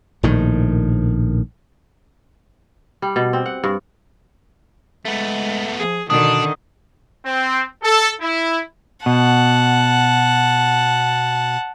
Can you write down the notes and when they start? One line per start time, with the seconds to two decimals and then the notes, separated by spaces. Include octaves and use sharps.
0.23 A#1 A2 D#3
3.02 G3
3.16 B2
3.33 C4
3.46 F#5
3.64 G2
5.05 G#3 A3 B3
5.78 F3 G#4
6.10 B2 D3 D#3 D4 D#6
7.26 C4
7.83 A4
8.21 E4
9.06 B2 F#5 A5